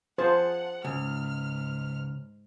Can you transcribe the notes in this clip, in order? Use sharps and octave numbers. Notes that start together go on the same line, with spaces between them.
F3 G#4 C5 F#5 A5
C#2 G#2 F6